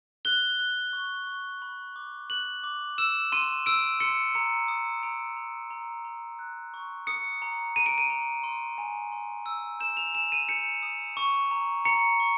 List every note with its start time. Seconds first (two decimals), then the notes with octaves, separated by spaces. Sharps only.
0.25 F#6 G7
0.59 F#6
0.93 C#6
1.27 C#6
1.62 B5
1.96 D6
2.30 F#6 F#7
2.63 D6
2.98 E6 E7
3.32 C6 D#7
3.66 E6 D7
4.00 C6 C#7
4.35 A#5 C#7
4.68 D#6
5.03 A#5 D7
5.36 A#5
5.70 A#5
6.05 A#5
6.39 F#6
6.74 C#6
7.07 D#6 C#7
7.42 A#5
7.76 A#5 D#7
7.86 D7
7.98 D#7
8.10 A#5
8.44 C6
8.78 G#5
9.12 C6
9.46 E6
9.80 G6 E7
9.97 F7
10.14 G#5 E7
10.32 D#7
10.49 G6 C#7
10.83 D#6
11.17 C#6
11.51 A#5
11.85 A#5 C#7
12.20 C#6